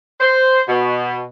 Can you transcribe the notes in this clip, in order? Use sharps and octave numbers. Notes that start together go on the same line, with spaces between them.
C5
B2